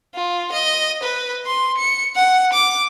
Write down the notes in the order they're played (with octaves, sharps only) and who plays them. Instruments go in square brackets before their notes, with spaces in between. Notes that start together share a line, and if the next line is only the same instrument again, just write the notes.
[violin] F4
D#5
B4
C6
C#7
F#5
D6